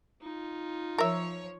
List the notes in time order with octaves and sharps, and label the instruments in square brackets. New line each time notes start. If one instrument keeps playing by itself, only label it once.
[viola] D#4 F4
[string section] F3 C#5 [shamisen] A#4 E5